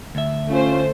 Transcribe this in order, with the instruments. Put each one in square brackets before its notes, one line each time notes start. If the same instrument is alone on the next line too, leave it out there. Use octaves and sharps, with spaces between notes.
[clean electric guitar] D2 E5
[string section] A3 C5 [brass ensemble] C#4 [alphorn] F4